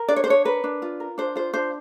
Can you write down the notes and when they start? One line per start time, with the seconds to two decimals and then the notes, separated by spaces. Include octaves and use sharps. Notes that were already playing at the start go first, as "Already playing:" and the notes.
Already playing: A#4
0.08 D4 D5
0.16 C#5
0.24 C5
0.27 D4 C#5
0.45 A#4 B4
0.64 D4
0.82 F4
1.00 A#4
1.18 D4 C5
1.35 F4 C5
1.54 D4 C5